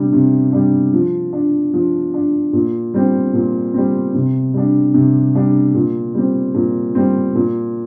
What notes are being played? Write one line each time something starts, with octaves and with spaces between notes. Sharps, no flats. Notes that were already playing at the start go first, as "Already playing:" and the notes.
Already playing: C3 G3 D4
C3
G3 D4
F3
D4
F3
D4
A#2
G3 C4
A#2
G3 C4
C3
G3 D4
C3
G3 D4
A#2
G3 C4
A#2
G3 C4
A#2